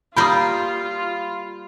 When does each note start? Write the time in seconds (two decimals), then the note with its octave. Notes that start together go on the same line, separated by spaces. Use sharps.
0.16 G3 A#3 F4 G4 B5 D#6